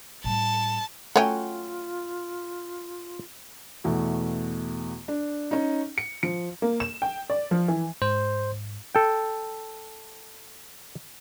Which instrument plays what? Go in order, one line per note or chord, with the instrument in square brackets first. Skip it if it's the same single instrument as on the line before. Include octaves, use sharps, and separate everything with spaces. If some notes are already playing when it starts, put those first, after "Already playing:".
[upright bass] A2 G3 [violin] A5
[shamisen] F#3 C#4 [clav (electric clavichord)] A3 [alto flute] F4 [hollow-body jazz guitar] F#5 G5
[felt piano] E2 B2 A3
D4
C#4 D#4
C#7
F3 C#7
[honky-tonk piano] A#3
E7
G5
D5
F3
E3
[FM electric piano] G#2 [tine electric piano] C5
[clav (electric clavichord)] A4 G5